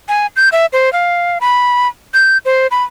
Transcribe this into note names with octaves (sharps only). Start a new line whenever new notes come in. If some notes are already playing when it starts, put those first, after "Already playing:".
G#5
G6
E5
C5
F5
B5
G6
C5
B5